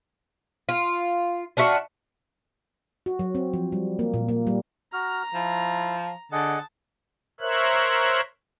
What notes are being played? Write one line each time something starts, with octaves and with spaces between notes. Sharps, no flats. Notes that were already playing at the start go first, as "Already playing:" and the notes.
F4
D4 F4 F#4 E5
F#4
F#3
C4
F3
G3
A#3
A#2
A#3
G3
F#4 A#5 F6
F3 E4
D3 G#4 D#5 F#5 A5
A#4 C5 C#5 E5 F#6